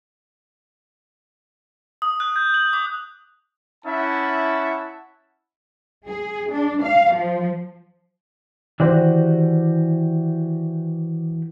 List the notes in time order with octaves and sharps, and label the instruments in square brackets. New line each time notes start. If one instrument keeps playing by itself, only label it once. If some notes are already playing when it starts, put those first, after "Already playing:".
[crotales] D#6
F#6
G6
F#7
D6
[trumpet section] C#4 E4 E5 F#5 A5
[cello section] G#4
D4
F5
F3
[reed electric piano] D#3 C5 D5 [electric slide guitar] E3 F#4 G4